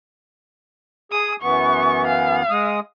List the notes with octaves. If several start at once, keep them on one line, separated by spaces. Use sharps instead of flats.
G#4 D#6
F#2 E3 B3 C#6
F5
G#3 D#6